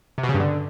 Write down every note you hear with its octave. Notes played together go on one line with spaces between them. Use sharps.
C3
B2
C#3
G2
D3